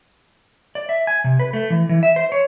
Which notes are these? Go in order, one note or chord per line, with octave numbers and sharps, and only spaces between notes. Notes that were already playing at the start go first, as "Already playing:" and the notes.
D5
E5
G#5
C3
B4
A3
E3
E3
E5
C5
C#5